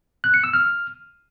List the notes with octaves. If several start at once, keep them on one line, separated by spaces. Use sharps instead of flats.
F#6
C#7
E6
F6